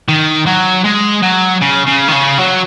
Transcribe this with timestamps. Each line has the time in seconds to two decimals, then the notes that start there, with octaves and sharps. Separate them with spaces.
0.09 D#3
0.47 F#3
0.85 G#3
1.23 F#3
1.61 C#3
1.86 C#3
2.08 D#3
2.12 C#3
2.38 F#3